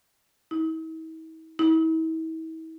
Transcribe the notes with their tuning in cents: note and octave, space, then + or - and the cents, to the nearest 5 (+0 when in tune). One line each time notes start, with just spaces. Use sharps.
E4 -45
E4 -40